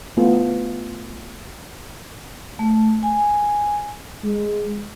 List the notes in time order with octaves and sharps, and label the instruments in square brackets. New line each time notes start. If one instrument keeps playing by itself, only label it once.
[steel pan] A3 B3 F4
[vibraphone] A3
G#5
[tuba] G#3